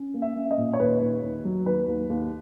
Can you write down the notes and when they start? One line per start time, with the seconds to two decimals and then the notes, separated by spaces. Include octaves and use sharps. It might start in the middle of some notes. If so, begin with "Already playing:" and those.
Already playing: C#4
0.14 A#3
0.22 E5
0.36 C#4
0.51 D#5
0.58 A#2
0.73 C#5
0.79 D#2 B4
1.01 D#2
1.23 D#2
1.45 F#3
1.65 D#2 B4
1.87 D#2
2.09 D#2